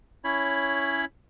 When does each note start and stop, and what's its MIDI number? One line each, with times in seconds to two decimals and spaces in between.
0.24 1.05 61
0.24 1.05 64
0.24 1.05 73
0.24 1.05 83